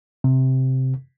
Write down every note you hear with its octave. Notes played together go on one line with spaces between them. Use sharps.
C3